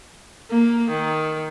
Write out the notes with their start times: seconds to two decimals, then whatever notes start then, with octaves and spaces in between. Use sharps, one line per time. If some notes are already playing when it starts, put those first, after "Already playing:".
0.50 A#3
0.89 D#3